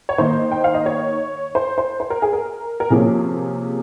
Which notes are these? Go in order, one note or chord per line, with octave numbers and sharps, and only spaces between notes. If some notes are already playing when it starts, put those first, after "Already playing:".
C#5
D#3 A#3 D#4 C5
G5
F5
D#5
C#5
C5
C5
C5
A#4
G#4
A#4
A#4
C3 F3 A#3 C#4 G#4